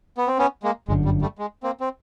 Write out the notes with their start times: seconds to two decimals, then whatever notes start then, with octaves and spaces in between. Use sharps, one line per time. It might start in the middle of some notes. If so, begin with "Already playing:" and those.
0.18 B3
0.27 C4
0.39 B3 C#4
0.63 G#3 A#3
0.88 G1 F#2 D3 G#3
1.05 G3
1.22 G3 A3
1.39 G#3
1.63 A#3 C4
1.80 C4